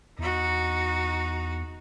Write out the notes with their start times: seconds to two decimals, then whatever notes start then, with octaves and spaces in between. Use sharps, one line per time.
0.19 E2 D#4 F#4